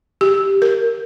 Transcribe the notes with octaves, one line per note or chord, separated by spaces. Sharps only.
G4
A#4